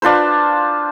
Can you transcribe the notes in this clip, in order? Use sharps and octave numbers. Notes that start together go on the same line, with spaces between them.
D4 F4 B4 C5